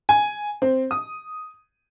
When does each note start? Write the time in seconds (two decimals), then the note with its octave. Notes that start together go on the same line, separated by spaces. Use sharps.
0.09 G#5
0.62 C4
0.91 D#6